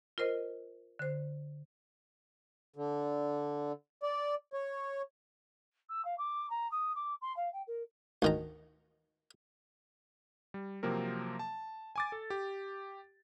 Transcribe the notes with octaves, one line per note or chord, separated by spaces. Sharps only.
F4 A#4 C5 D#5
D3 C5
D3
D5
C#5
E6
F5
D6
A#5
D#6
D6
C6
F5
G5
A#4
D2 D#3 A#5
G3
C3 F3 F#3 A#3 C4 A#4
A5
G#5 D6 A6
A4
G4